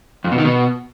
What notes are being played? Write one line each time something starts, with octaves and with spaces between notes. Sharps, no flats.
F2
B2
D#3
B2